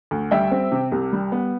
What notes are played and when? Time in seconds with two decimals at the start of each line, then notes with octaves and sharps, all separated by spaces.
0.11 D2
0.31 G3 E5 G5
0.52 C4
0.72 C3
0.92 C2
1.13 G3
1.32 B3